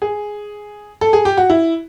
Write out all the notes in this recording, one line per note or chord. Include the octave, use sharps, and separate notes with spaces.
G#4
A4
G#4
G4
F#4
E4